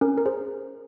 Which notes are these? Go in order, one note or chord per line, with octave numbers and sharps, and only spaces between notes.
C#4 A#4
A#4
G#4 C5